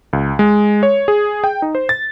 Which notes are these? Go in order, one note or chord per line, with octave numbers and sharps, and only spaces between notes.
C#2
G#3
C#5
G#4
G5
D#4
C5
A6